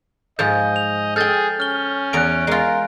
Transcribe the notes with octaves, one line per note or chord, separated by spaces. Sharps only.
G#2 F3 D#5 G#5 G6
F7
G#4 A4 G5 F6 G6 A6
C#4 F6 G7
E2 A#5 F#6 D7
G#3 F4 A#4